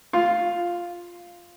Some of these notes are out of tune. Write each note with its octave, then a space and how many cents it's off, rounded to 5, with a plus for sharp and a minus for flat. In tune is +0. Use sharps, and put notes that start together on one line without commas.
F4 +0